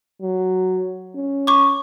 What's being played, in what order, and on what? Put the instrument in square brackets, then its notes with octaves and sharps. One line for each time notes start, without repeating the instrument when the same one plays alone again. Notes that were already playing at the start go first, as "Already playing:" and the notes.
[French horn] F#3
C#4
[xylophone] C#6 D6